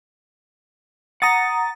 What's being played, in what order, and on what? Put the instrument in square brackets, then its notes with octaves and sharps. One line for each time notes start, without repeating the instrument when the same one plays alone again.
[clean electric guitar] F#5 [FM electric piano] A#5 D#6 A6